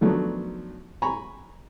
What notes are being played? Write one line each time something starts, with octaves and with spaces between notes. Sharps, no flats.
D#3 F3 F#3 A3 B3 D4
G#5 A#5 B5 C#6